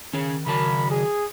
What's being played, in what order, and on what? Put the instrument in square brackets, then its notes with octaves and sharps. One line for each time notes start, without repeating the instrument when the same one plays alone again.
[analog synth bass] D#3 [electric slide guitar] C#4 G#4
[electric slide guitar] C#3 F#3 A5 [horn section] A#4 B5
[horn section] G#4